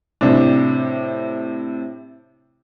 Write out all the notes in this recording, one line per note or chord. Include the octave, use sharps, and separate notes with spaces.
A2 C3 D4